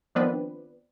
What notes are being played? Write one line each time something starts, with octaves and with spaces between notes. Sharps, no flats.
D#3 F3 B3 C4 D4 B4